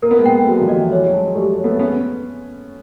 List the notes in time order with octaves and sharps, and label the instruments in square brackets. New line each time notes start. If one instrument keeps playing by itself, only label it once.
[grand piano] A#3 [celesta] A#4
[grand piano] B3
G#3 A#3
[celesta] G5
[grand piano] A3
[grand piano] F#3 G#3 [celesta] F#4
[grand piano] F3 G3
[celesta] D#5
[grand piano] E3 F#3
[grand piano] G3 A3 [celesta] C#5
[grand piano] F#3 G#3
[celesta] A5
[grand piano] G#3
[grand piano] G3 A3 [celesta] G4
[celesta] C#5
[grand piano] A3 B3
[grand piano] B3 C#4 [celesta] G#4